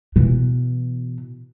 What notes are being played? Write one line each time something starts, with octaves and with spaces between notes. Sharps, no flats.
B2 E3